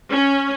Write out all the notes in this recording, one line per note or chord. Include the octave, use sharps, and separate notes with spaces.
C#4